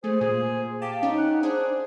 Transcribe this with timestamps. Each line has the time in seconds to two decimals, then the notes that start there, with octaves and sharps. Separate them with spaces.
0.04 A3 G#4 C5
0.21 A#2 G#4
0.82 G4 F5 A5
1.03 C#4 D#4
1.18 F#5
1.43 D4 G#4 C5